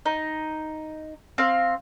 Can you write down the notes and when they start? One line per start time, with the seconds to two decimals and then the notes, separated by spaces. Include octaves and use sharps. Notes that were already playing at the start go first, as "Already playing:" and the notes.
0.06 D#4
1.38 C4 F5